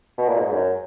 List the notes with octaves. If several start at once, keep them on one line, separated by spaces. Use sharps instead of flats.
B2
A#2
G#2
F#2